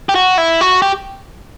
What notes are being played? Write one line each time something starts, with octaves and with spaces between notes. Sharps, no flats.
G4
F#4
E4
F#4
G4